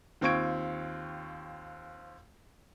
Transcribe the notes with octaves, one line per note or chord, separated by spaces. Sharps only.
D#2 C4 F4 C#6 G#6 D7